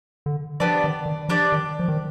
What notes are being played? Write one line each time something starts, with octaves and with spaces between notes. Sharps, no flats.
D3
F3 B3 D4 G4 D5
D#3
D#3
F3 D4 G4 D5
D#3
F3
D#3